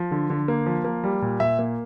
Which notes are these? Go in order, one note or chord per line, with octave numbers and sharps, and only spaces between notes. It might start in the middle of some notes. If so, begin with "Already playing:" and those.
Already playing: F3
D3
D3
A#3
F3
A#3
G3
A#2
A#2 E5
A#3